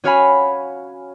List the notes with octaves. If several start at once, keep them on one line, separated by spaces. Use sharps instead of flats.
C#4 F#4 C#5 F5 G#5 B5